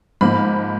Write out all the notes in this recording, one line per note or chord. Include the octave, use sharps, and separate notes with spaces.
G#2 F3 A#3 B5